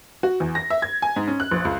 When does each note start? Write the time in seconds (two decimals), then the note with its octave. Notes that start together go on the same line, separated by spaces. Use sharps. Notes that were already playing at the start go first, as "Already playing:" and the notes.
0.23 F#4
0.40 E2
0.55 A#6
0.70 E5
0.82 G#6
1.02 G#5
1.16 G#2
1.27 C#4
1.40 F#6
1.51 A#1
1.65 C#2